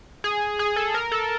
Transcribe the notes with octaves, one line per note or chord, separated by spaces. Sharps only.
G#4
G#4
A4
A#4
A4